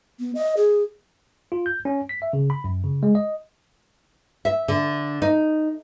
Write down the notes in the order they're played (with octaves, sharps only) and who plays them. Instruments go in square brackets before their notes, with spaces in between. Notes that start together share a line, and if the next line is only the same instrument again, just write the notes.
[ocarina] B3
D#5
G#4
[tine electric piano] F4
G6
C#4
B6
E5
C#3
B5
F#2
C#3
G#3
D#5
[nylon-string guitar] E5
D3
D#4